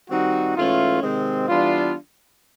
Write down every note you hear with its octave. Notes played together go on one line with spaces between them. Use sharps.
D#3 G3 C4 D#4 F#4
G#2 E3 A3 C#4 F4
C3 D#3 G#3 C4
E3 G3 B3 D4 F4